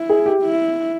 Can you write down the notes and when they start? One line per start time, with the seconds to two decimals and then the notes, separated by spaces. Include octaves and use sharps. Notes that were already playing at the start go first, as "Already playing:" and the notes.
Already playing: E4
0.09 G#4
0.26 G4
0.42 E4